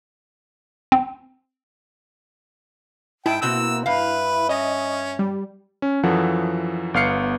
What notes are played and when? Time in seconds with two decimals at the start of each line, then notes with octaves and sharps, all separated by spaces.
0.92 C4
3.26 G#2 E4 G5 A5
3.42 B2 A#3 C4 F#4 E6
3.86 G2 B4 E5 F5
4.49 C#4 D#5
5.19 G3
5.82 C#4
6.03 F#2 E3 F3 A4 F#5
6.94 G1 B3 F5 F6 C7 C#7